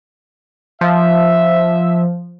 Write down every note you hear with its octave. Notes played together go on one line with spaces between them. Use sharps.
F3 E5